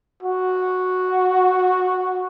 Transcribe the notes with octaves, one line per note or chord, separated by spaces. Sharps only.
F#4